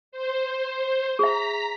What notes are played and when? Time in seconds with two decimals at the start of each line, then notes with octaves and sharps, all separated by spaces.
0.12 C5
1.19 G#4 E5 A#5 B6